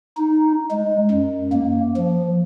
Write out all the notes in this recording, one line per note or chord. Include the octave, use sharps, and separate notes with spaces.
D#4
G#3
F#2
A#3
F3